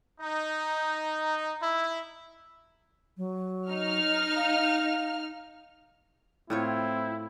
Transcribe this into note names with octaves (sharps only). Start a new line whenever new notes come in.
D#4
E4
F#3
D#4 F6
F5
A2 C4 E4 F4 C#5